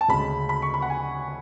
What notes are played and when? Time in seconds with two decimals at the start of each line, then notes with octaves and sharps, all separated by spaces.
0.01 A5
0.08 D2 C#3 G#3 B5
0.49 B5
0.62 C#6
0.74 B5
0.82 F#5
0.90 G#5